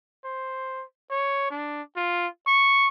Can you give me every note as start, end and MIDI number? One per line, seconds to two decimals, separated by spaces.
0.24 0.84 72
1.11 1.50 73
1.51 1.82 62
1.96 2.28 65
2.47 2.88 85